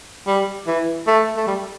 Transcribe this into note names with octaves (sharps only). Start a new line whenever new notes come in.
G3
E3
A3
A3
G3